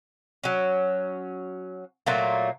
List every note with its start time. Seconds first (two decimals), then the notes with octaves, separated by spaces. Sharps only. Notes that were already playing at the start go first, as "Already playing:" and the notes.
0.44 F#3 C#4
2.06 A#2 F#3 A3 A#3